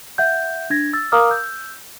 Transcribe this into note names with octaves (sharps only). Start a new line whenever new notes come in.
E5 F#5 G6
D4 G#6 A#6
E6 A6
A#4 F5 A#5 D6 D#6 F6
E6 G6